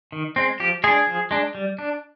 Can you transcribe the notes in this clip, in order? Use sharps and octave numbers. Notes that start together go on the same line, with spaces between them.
D#3
G#3 C4
F3 G4
G#3 D4 G#4
F3
G#3 D4
G3
D4